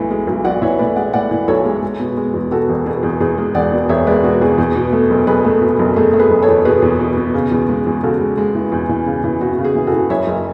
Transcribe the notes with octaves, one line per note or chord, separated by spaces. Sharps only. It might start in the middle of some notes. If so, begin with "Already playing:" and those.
Already playing: B1 A2 E3
G#3
B1
B1 D5 F#5
E3 C#5 E5
A2 B4 D5
G#3 D5 F#5
A2 D5 F#5
E3
B1 A4 C#5
G#3
G#3
B2
G#3
E2
B2 F#4 A4
E1
B2 G#4
E2
E2 G#4
G#3
E1 D5 F#5
B2
E1 C#5 E5
G#3 B4 D5
B2 F#4
E2 G#4
E2
B2
A3
F#1
F#1 G#4 B4
A3
B2
F#1
A3 G#4
A3
G#4 B4
F#1
A4 C#5
E2
B2 G#4 B4
E2
B2
B2
C#3
E2
G#3
E2
C#3 F#4 A4
G#3
G#3
E3
E2
E3
C#3
E3
E2 F#4
C#3
G#4
E3
F#4 A4
E3
F#1 C#5 E5
F#1